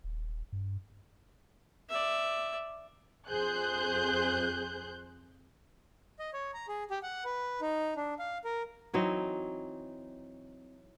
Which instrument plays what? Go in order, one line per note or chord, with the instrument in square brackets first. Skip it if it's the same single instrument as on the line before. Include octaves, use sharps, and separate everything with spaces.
[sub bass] D#1
G2
[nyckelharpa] D5 E5
[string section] F2 G#4 C5 F#6 G6
[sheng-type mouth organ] D#5
C#5
A#5
G#4
G4
F#5
B4
D#4
D4
F5
A#4
[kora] E3 F#3 C4 D#4